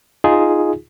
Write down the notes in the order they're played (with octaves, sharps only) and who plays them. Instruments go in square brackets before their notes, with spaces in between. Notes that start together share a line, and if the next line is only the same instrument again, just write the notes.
[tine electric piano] D#4 F4 G#4